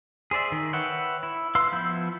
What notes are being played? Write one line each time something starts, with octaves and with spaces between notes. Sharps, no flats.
G#4 C5 D5 E5
D#3
B4 C#5 E5 F#5 G5
E4
B4 F5 B5 C6 E6
F3 B3 E4 G6